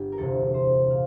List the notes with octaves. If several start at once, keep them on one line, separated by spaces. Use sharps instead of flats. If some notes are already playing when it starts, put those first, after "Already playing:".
Already playing: G1 D3 G4
A#4
E1 D2 C3 A4
C5
A#2 F5